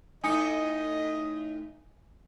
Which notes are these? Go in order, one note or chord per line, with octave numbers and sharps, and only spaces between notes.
A2 D#4 D#5 G#5 D#6 C#7